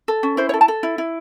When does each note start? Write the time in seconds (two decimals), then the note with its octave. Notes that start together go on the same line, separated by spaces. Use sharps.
0.08 A4
0.23 C#4
0.37 E4 C5
0.49 C#5
0.54 A4
0.61 A5
0.68 A4
0.83 E4
0.98 E4